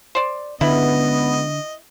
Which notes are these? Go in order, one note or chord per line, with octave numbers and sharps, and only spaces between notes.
C5 D5
C#2 D3 B3 E4 D#5 B5